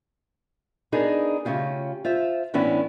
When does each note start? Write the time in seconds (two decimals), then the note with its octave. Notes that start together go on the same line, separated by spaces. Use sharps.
0.92 B3 D4 D#4 G#4 A#4
1.45 C#3 A3 C#4 F4 G4
2.05 F4 C5 E5
2.54 A2 E3 B3 C#4 D4 E4